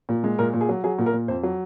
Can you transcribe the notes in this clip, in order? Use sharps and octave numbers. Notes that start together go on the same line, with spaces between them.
A#2
G#3
A#2 A#4
A#2
G#4
F#3
F#3 G#4
A#2
A#4
A#2
F2 C5
F#3